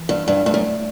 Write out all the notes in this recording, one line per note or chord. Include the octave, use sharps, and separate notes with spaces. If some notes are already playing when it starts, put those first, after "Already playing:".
Already playing: E3
G2
G2
G2 A3
F#2